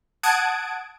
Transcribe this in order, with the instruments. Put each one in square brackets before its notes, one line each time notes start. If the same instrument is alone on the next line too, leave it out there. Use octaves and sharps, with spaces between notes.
[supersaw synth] F#5 A5 D#6 G#6 D7